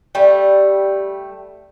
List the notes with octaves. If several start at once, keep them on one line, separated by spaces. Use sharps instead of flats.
G3 A3